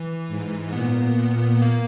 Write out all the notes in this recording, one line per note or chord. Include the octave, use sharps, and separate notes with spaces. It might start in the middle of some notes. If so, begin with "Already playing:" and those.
Already playing: E3
G#2
A#2 B3
A#3